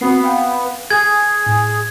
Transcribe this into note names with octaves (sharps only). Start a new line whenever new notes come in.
B3 C4 F#4 C7
F5 G5
G#4 G#6
A2